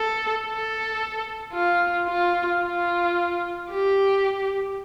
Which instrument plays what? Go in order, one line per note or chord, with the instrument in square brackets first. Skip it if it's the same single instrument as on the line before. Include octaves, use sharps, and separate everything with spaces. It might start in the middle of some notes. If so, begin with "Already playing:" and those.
Already playing: [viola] A4
A4
F4
F4
F4
G4